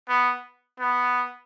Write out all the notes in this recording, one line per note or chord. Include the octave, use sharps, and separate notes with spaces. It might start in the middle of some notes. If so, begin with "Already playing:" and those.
B3
B3